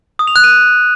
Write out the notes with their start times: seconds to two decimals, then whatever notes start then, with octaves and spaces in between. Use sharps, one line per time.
0.19 D#6
0.27 F7
0.36 F#6
0.44 D#7